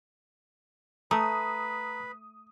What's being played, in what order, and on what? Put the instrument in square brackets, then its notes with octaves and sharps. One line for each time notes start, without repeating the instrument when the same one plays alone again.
[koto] A3 [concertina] B4 [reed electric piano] A#5 [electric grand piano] D#6